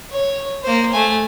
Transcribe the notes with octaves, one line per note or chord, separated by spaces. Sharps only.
C#5
A#3 C5
A3 G#5